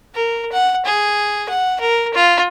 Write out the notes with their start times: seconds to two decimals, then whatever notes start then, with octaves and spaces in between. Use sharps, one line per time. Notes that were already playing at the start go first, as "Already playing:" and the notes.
0.15 A#4
0.52 F#5
0.86 G#4
1.49 F#5
1.80 A#4
2.14 F4